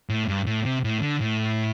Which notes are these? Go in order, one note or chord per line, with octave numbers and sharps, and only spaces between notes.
A2
G2
A2
C3
A2
D3
A2